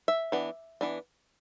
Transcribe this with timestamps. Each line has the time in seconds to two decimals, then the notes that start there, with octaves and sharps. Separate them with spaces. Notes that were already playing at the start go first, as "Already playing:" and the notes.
0.08 E5
0.32 E3 B3 D4
0.81 E3 B3 D4